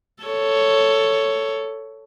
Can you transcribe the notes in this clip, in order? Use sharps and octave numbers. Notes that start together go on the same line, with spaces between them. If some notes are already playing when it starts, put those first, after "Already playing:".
A4 C#5